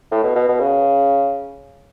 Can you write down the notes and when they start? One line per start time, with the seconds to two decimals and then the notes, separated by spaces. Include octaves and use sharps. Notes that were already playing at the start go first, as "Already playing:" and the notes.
0.12 A2
0.23 B2
0.35 B2
0.49 B2
0.60 C#3